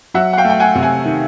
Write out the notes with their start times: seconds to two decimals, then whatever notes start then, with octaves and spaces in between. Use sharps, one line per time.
0.14 F#3 E5 F#5
0.33 F#5
0.37 F5 G5
0.45 A3
0.50 G5
0.60 F#5 G#5
0.75 C3
0.83 F#5 G#5
1.05 D#3